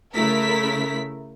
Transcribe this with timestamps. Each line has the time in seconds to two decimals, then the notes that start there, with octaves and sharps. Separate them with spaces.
0.15 C#3 A3 E4 A#4 B6